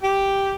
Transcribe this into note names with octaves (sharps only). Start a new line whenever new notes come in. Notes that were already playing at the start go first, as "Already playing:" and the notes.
G4